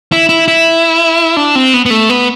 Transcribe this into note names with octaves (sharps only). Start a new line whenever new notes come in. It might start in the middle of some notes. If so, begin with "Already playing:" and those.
E4
E4
E4
D4
C4
B3
B3
A3
B3